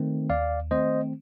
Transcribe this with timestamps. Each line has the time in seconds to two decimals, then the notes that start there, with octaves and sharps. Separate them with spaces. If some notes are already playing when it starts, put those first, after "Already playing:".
Already playing: D#3 A3 C4
0.30 D#2 D5 F5
0.71 D#3 A3 C4 C5 D#5